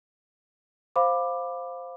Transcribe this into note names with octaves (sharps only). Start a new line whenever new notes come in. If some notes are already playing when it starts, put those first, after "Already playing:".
C5 F5 B5 D6